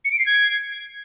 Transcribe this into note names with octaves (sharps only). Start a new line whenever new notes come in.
C#7
D7
C7
G#6